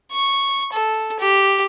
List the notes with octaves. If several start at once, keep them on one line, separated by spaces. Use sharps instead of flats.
C#6
A4
G4